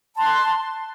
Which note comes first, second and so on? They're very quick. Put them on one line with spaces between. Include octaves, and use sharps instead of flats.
A5 C6 F#6